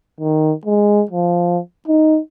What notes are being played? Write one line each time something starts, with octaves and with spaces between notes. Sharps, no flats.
D#3
G#3
F3
D#4